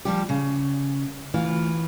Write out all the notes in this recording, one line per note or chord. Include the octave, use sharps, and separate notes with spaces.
F3 G3 G4
C#3
D2 E3 F4